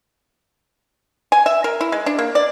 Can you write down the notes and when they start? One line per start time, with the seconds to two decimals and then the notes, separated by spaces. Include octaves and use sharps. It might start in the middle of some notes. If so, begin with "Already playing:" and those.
1.32 G#5
1.46 E5
1.64 A#4
1.81 E4
1.92 G#3
2.06 D4
2.19 A#3
2.35 D5